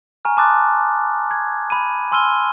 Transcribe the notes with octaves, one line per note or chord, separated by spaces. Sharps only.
G#5 A#5 C#6 F6
A5 C6 D6 D#6 F#6 A6
G#6
B5 D#7
G#5 C6 E6 F6 D#7 G7